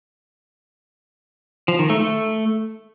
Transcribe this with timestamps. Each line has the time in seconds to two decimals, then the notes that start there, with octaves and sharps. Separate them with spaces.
1.68 F3
1.79 D#3
1.90 A3
2.00 A3